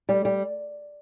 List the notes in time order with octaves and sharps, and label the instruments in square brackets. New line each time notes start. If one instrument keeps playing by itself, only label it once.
[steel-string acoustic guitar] G3
G3